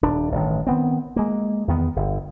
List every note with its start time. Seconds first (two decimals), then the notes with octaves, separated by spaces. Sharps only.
0.02 D#1 D4
0.32 A1 G2 D#3
0.67 D#3 B3 C4
1.16 G#3 A#3
1.68 E2 D#3 B3
1.96 G1